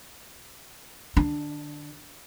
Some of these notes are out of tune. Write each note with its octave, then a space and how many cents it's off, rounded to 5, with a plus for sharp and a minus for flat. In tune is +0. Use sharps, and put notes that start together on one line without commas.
D3 +35 D4 +0